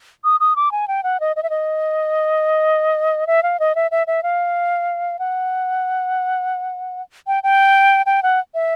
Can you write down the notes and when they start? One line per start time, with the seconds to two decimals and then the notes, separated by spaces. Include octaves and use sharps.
0.24 D#6
0.40 D#6
0.56 D6
0.72 G#5
0.88 G5
1.03 F#5
1.20 D#5
1.36 D#5
1.43 E5
1.50 D#5
3.27 E5
3.43 F5
3.60 D#5
3.75 E5
3.91 E5
4.07 E5
4.23 F5
5.19 F#5
7.27 G5
7.43 G5
8.06 G5
8.23 F#5
8.54 E5